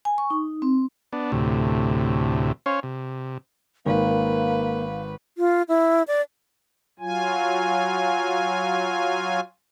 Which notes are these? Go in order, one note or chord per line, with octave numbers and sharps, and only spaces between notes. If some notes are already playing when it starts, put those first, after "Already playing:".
G#5
C#6
D#4
C4
B3 D4
D2 A2 C3
C#4 C5 C#5 F5
C3
G#1 A#3 B4 F5
F4
E4
D5
F#3 F4 G#5